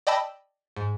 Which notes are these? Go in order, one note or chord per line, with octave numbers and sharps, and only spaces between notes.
D5 D#5 G5 A5 B5 E6
G#2